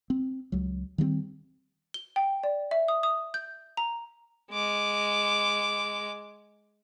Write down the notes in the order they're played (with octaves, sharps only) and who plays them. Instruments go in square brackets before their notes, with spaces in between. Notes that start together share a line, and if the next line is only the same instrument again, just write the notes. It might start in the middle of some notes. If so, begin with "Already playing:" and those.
[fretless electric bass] C4
C#2 F#3
D#3 G3 A#3 C4
[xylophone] G7
G5
D5
E5
D#6
D#6
G6
A#5
[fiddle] G#3 D6